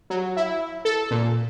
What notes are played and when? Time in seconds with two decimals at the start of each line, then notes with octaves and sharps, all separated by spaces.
0.10 F#3
0.37 E4
0.85 A4
1.11 A#2